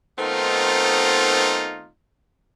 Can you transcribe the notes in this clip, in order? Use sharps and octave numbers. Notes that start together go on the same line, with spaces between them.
D#3 A3 B3 C4 D#4 F4